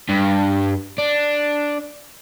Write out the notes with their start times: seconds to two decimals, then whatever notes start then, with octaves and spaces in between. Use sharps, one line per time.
0.09 G2
0.98 D4